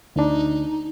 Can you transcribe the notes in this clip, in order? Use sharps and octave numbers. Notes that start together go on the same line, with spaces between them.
D2 D4 D#4